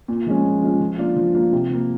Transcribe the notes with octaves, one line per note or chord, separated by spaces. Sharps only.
A#2
F3 G#3 C#4
A#2
F3 G#3 C#4
F3
A#3 D4 F4
F3
A#3 D4 F4
C3
F3 A#3